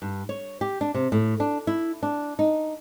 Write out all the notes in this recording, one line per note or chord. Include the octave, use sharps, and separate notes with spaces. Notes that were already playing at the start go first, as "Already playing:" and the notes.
G2
C#5
G4
D4
C3
A2
D4
E4
D4
D#4